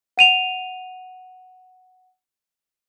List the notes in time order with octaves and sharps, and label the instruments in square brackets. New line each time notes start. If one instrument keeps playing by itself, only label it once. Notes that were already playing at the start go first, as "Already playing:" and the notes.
[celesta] F#5 D#7 F7